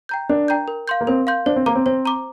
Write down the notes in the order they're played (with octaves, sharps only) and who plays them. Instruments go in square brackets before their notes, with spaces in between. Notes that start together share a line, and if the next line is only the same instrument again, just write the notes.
[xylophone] G5 A#5 G6
[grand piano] D4 [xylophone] A#4
[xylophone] G5 A#5 G6
A#4
F5 C6 G6
[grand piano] A#3
[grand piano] C4 [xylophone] A#4
[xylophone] F5 C6 G6
[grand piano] D4 [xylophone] C5
[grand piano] C4
[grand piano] A#3 [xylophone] A#5 D6
[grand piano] C4
[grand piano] C4 [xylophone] C5
[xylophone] A#5 D6